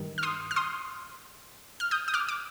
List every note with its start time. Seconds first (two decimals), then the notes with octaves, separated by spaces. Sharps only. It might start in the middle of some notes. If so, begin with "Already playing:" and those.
Already playing: G2 D#3
0.18 F6
0.23 C6 D#6
0.51 F6
0.56 C6 D#6
1.80 F6
1.91 D#6 G6
2.08 D#6
2.14 D6 F6
2.29 D6